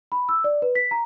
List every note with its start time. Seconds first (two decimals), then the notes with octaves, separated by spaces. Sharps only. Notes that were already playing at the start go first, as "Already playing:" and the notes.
0.12 B5
0.29 E6
0.44 D5
0.62 B4
0.75 B6
0.91 A#5